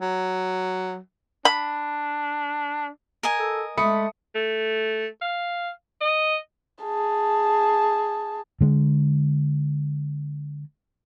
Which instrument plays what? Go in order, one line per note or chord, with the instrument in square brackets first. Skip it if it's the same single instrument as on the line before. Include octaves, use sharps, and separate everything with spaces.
[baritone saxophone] F#3
[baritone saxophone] D4 [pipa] B5
[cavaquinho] A#4 D#5 G#5
[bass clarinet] A4
[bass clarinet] G#3 [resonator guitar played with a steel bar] A3 [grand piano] B5 D#6 C#7
[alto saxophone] A3
F5
D#5
[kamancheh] G#4 A5
[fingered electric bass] D3 G#3